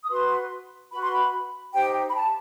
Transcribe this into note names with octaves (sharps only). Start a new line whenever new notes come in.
D#6
F#4 B4 C6
F#4 B4 B5
C6
B5
D#4 G4 C5 G5
B5
A5